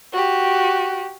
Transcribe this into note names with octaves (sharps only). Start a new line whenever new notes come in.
F#4 G4